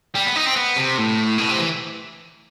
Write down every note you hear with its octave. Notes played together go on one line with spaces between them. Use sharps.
G3
B3
D#4
C4
B3
C3
A2
B2
C3
E3